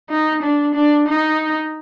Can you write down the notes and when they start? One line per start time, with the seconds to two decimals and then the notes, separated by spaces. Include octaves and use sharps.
0.10 D#4
0.42 D4
0.74 D4
1.08 D#4